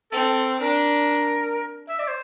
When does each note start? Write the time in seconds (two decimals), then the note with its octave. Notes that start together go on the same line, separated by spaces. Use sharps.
0.12 C4 A4
0.61 D4 A#4
1.89 E5
1.99 D5
2.08 C5